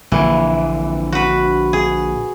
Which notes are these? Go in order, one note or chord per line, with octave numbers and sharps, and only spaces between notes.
A#1 D3 E3
F#4 B4
G#4